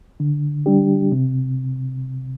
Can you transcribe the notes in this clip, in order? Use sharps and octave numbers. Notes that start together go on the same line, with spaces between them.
D3
G3 D4 G4
C3